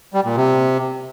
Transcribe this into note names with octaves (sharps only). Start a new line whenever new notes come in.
G3
A#2
C3